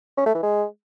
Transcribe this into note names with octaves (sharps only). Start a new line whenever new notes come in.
C#4
A3
E3
G#3